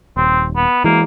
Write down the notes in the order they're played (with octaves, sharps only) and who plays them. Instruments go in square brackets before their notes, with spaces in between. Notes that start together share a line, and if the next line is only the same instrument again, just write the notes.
[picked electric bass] D#1 [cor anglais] C4
[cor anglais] B3
[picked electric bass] E3 G#3 [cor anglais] A#3